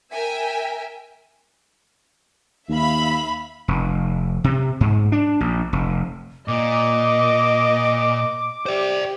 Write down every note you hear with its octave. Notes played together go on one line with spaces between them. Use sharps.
A#4 E5 G5 G#5
D#2 E5 F5 B5
F1
C3
G#2
D4
A#1
F1
A#2 D#5 D6
G4 C5 D5